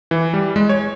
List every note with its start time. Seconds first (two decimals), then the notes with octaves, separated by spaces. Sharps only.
0.11 E3
0.34 G3
0.56 G#3
0.69 C#5